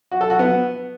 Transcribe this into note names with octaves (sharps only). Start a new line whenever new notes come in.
F#4
A4
F#4
B3